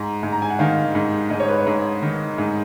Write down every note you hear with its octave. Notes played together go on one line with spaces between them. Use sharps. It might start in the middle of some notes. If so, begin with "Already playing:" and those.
Already playing: G#2 A#5
G#2
A#5
G#5
F#5
D#3 F5
G#2
G#2 D#5
C#5
B4
C#5
G#2
D#3
G#2